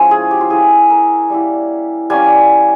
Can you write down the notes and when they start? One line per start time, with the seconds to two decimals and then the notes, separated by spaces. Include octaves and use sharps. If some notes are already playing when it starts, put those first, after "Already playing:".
Already playing: F3 G#3 C#4 E4
0.11 G#4
0.31 G4
0.41 F4
0.50 A#3 E4 G#4
0.90 A#4
1.30 G3 A#3 E4
2.10 G3 A#3 C#4 G#5